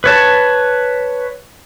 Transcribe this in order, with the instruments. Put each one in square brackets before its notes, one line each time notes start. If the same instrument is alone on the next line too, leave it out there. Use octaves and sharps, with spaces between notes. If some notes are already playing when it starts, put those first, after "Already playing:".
[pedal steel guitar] B4 C#5 A5